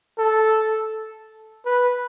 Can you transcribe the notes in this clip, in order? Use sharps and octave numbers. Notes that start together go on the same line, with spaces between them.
A4
B4